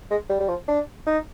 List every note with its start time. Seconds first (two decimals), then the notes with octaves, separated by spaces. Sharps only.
0.10 G#3
0.29 G3
0.40 G3
0.48 F3
0.68 D4
1.06 D#4